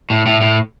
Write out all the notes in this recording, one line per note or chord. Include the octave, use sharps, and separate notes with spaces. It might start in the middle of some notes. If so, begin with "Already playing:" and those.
A2
A2
A2